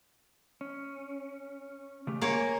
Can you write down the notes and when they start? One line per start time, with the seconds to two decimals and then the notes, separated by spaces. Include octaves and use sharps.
0.61 C#4
2.07 C#3 A3 G4
2.21 A#3 C#5 G#5